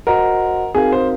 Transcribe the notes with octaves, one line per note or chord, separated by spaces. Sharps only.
F#4 A#4 C5 D#5 F#5
C4 D#4 F#4 G#4 A#4 F5
C5